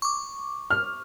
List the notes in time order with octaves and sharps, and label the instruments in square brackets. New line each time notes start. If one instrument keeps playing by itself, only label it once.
[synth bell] C#6 D6
[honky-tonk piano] F6